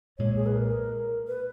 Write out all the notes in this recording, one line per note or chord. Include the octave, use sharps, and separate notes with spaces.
B1 A#2 G#3 C#5
G#4
B4
A#4
B4